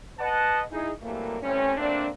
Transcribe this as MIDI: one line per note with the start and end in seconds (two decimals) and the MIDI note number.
0.19 0.61 71
0.19 0.61 75
0.19 0.61 78
0.19 0.61 81
0.72 0.90 63
0.72 0.90 64
0.72 0.90 68
1.02 1.38 48
1.02 1.38 52
1.02 1.38 54
1.02 1.38 55
1.02 1.38 57
1.02 1.38 58
1.42 1.75 52
1.42 1.75 55
1.42 1.75 57
1.42 1.75 60
1.42 1.75 61
1.77 2.07 54
1.77 2.07 57
1.77 2.07 58
1.77 2.07 60
1.77 2.07 62